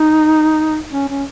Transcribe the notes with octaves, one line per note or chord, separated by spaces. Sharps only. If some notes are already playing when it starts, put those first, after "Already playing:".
Already playing: D#4
C#4
C#4